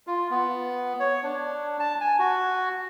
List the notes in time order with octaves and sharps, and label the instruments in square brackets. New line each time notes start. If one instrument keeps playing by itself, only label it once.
[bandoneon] F4
B3
C#5
D4
A5
G#5
F#4